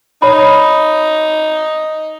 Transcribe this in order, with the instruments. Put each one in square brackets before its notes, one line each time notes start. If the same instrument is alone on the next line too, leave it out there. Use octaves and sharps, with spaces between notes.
[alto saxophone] D#4 [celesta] C#5 B5